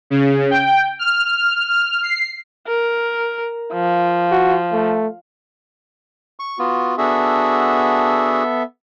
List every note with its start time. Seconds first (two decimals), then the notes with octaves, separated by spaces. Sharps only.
0.10 C#3
0.51 G5
0.99 F6
2.03 C7
2.68 A#4
3.73 F3
4.32 F#4
4.72 A3
6.40 C#6
6.59 B3 F4 F#4
6.98 B3 D4 F#4 G#4 A4 E5